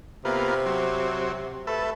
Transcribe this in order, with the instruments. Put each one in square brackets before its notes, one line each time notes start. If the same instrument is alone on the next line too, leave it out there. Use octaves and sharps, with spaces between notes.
[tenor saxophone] C3 [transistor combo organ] A#3 B3 F4
[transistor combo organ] F#3 C4
[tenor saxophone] A3 [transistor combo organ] A4 B4 E5